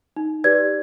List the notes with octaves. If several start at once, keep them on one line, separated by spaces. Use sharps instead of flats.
D#4
G4 B4 D5 G#6